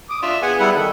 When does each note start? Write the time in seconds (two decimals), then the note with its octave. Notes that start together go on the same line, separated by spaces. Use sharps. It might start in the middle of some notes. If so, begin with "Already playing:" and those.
0.10 D6 D#6
0.23 D4 F4 E5
0.42 B3 G#4 F#5 G#5
0.60 G3 E4 F#5
0.76 D#3 A4